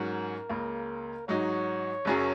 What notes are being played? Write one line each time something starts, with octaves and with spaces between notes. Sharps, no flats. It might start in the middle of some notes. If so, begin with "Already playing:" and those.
Already playing: G#2 F#3 C#4 A#4
C#2 C#3 A#3
G#2 F#3 D#4 C#5
F#1 F#2 F#3 C#4 G#4